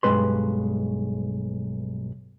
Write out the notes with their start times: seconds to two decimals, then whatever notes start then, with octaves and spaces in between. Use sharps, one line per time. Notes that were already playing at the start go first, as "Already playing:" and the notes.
0.03 B1 G2 A#2 G#3 B4 C6